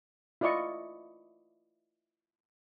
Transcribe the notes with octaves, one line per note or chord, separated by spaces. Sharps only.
E4 F4 D5 D#5 C#6